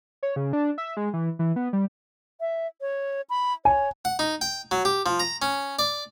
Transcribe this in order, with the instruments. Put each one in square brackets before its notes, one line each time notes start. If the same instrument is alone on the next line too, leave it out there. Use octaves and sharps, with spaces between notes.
[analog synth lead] C#5
C#3
D4
E5
G#3
E3
E3
B3
G3
[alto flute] E5
C#5
B5
[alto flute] C#5 [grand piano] G#5
[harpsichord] F#5
D#4
G5
F#3
G4
F3
A#5
C#4
D5